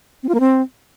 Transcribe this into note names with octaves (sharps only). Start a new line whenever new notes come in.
C4
F4
A#3
C4